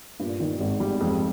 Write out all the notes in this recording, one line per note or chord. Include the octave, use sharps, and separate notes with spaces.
G2 A#2
D#3
G#1 G#3
G3
F2 G#3